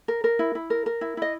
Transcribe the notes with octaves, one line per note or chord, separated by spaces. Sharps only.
A#4
A#4
E4
E4
A#4
A#4
E4
E4 D#5